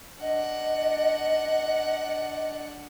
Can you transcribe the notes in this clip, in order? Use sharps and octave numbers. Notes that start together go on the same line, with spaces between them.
D4 D#5 F#5